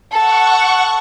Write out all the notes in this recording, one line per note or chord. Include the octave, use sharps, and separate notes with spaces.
A4 F#5 C#6